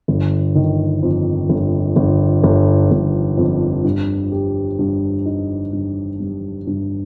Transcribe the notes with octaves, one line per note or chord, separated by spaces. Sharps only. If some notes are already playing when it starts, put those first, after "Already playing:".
G1
D#3
F2
G1
G1
G1
G1
F2
G2
G4
G2
D#4
G2
G3
G2